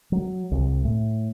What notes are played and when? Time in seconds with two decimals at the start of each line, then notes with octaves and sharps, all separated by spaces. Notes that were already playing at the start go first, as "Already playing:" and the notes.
0.12 F#3
0.51 C2
0.85 A2